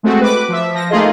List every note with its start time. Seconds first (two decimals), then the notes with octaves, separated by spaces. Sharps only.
0.03 G#3 A3 C4 F#4
0.21 B4 D6
0.48 F3 E5
0.74 F3 A#6
0.90 A3 A#3 D#4 F4 G#4 D#5